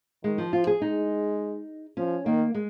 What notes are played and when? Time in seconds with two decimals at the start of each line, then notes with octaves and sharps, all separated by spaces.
0.24 D#3 G#3
0.38 F3
0.53 F3 F4
0.67 G#4
0.82 G#3 D#4
1.97 F3 C#4
2.25 D#3 A#3
2.55 G#3